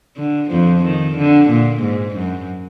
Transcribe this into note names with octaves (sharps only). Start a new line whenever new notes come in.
D3
F2 F3
D#3
D3
A#2
G#2
F#2